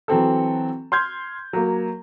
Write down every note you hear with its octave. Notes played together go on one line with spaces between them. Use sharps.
E3 F#3 C4 A4
C6 F6 G6 G#6
F#3 A#3